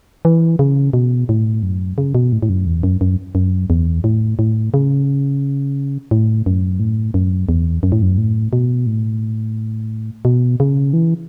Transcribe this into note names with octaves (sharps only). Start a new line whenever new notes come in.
E3
C#3
B2
A2
F#2
C#3
B2
A2
A2
F#2
E2
F#2
F#2
F#2
E2
A2
A2
C#3
A2
F#2
A2
F#2
E2
F#2
A2
F#2
A2
B2
A2
B2
C#3
E3